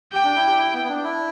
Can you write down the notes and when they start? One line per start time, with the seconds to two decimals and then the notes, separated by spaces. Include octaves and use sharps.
0.12 G4 G5
0.24 D4
0.36 E4
0.47 G4
0.58 E4
0.73 B3
0.84 B3
0.89 D4
1.04 E4